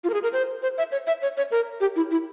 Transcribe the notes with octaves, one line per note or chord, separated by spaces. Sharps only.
F4
A#4
G#4
A#4
C5
C5
E5
C#5
E5
C#5
C#5
A#4
G4
E4
E4